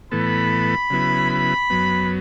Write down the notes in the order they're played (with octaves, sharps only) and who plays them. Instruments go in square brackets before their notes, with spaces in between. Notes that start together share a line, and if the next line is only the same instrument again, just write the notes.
[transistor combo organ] A2 E3 B3 A4 [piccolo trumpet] B5
[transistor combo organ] C#3 F#3 B3 E4
[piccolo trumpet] B5
[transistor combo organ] F#2 F#3 B3